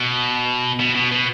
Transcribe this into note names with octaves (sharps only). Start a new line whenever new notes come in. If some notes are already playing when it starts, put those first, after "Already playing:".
Already playing: B2
B2
B2
B2